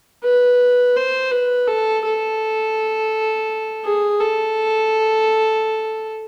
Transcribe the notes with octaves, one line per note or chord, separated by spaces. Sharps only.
B4
C5
B4
A4
A4
G#4
A4